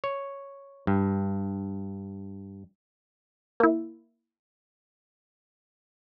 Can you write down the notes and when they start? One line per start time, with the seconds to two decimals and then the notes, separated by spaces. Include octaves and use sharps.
0.04 C#5
0.87 G2
3.60 A#3 E4